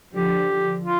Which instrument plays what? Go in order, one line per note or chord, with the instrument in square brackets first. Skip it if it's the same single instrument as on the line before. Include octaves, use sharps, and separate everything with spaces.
[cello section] D3 F3 [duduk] G4
[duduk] F4